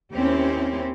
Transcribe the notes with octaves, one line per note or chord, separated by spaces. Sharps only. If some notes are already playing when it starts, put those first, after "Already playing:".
D#2 C4 C#4 E4 G4